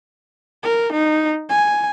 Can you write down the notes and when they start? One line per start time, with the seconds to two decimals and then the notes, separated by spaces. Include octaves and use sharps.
0.63 A#4
0.92 D#4
1.49 G#5